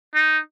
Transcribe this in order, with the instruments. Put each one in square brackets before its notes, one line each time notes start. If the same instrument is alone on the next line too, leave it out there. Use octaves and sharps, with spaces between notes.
[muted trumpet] D#4